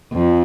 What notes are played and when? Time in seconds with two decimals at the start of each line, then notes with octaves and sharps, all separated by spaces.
0.13 F2